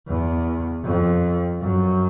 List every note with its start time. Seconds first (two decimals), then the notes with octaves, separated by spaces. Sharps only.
0.08 E2
0.84 F2
1.61 F#2